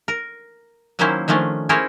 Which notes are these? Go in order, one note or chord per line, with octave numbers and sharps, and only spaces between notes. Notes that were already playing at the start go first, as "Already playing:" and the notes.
A#4
D#3 F#3 A#3 C#4 E4 C5
D#3 F3 A3 C#4 D4
C#4 E4 G#4 A#4 C5 C#5